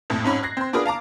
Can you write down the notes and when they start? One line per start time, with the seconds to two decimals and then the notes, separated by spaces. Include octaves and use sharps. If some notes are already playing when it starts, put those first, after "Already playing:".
0.10 A#1 F2 A2
0.24 F2 G#2 C#4 B5
0.43 F#6 G#6 A#6 C7
0.57 C4 C6
0.73 B3 D4 F4 G#4 A#4 B4
0.85 F5 A5 A#5 D6